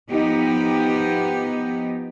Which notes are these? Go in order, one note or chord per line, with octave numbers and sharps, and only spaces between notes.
F3 B3 D#4 G4